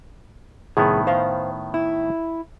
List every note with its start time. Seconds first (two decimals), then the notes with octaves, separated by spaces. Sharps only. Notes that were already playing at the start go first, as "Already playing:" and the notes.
0.77 C2 A2 D#3 B3 G#4
1.07 C5 F5
1.74 E4